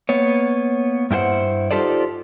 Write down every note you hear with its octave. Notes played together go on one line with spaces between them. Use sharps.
A#3 B3 C#5
G2 E4 G4 C5 F#5
D#4 F4 G4 A4 C5 D5